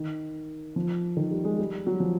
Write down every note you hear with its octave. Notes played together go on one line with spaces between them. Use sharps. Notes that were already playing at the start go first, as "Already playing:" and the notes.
Already playing: D#3
F3
D#3
G3
G#3
G3
F#3
F3